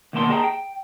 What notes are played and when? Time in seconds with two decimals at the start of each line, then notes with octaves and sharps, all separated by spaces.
0.13 D2 B2 D#3 A#3 A5 C6
0.30 G#4 D#5 G5 A5 A#5
0.44 G5